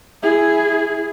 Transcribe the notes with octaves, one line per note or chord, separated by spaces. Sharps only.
E4 G#4